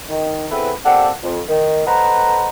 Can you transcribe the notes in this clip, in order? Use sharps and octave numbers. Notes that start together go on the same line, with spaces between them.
D#3
B3 C4 E4 G#4 A4 B4
A#3 C4 G4 A4 D5 F#5
F2
D#3
A4 B4 C5 D#5 F#5 A#5